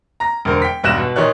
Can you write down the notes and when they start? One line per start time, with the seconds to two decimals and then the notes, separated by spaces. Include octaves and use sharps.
0.20 A#5 A#6
0.45 E1 D3 A#4 C5
0.62 G5 B6
0.83 E1 B1 G3 F#6 A#6 E7
0.98 B2
1.16 A#2 D#3 D#4 G4 C#5 F#6